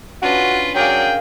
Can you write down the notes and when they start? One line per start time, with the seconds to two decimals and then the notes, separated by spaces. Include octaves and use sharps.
0.22 C#4 D4 F4 F#4 B4
0.76 F#3 G#4 A#4 D5 F5 G5